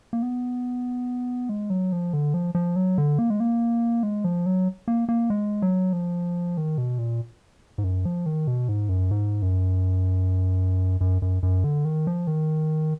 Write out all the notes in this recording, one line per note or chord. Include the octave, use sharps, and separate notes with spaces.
A#3
B3
G#3
F#3
F3
D3
F3
F3
F#3
D3
A#3
G#3
A#3
G#3
F3
F#3
A#3
A#3
G#3
F#3
F3
D#3
B2
A#2
G#2
F#2
F3
D#3
B2
G#2
F#2
G#2
F#2
F#2
F#2
F#2
D3
D#3
F3
D#3